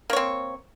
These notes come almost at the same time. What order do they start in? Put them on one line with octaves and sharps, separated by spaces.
A#3 C#5 C4